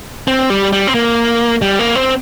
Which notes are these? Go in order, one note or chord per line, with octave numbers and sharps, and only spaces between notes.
C4
G3
G3
C4
A#3
G3
A#3
C4